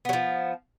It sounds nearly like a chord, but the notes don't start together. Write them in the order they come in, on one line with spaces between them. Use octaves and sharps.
B3 F#3 F3